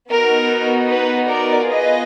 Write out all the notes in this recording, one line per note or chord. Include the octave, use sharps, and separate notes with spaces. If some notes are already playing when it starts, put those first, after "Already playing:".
B3 D#4 F#4 A#4
B4
A#4 D5
B3 F4 G#4 B4 D#5